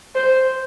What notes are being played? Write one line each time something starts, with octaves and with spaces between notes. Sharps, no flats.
C5